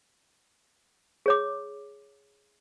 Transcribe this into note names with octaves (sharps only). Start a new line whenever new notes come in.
G#4 C#5 D6